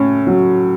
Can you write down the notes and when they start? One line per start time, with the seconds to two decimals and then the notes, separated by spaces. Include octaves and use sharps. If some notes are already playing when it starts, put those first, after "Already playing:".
Already playing: A2 C#4
0.27 F#3